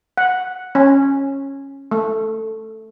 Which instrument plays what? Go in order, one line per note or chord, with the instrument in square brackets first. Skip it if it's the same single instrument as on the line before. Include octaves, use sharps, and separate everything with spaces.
[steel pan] F#5
C#4
A3